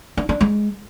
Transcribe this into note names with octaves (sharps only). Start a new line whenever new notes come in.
D4
D4
G#3